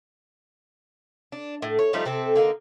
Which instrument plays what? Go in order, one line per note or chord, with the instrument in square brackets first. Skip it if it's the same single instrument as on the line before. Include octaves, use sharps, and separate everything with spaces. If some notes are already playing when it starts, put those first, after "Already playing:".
[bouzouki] D4
A2
C#5
F3 G3 A3 D#4
C3 C4 A4
D3 A#3 D#4